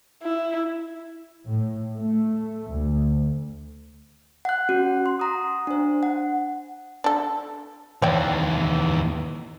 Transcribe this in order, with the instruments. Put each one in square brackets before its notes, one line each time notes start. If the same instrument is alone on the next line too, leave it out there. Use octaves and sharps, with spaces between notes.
[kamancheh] E4
[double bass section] A2
A3
D2
[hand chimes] F#5 F#6
C#4 F#4
C6
F#5 A#5 D#6
D4 C5
F#5
[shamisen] D4 A4
[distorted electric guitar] D#2 E3 [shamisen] C#5 D5 G5